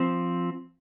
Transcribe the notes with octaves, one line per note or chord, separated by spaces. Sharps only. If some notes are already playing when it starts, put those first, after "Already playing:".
Already playing: F3 C4